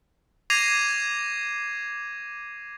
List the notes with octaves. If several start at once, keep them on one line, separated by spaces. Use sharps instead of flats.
D6 G#6 A#6 C7 D#7 F7